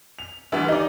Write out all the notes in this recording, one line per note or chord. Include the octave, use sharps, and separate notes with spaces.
F7
D2 E3 G3
D#4 D5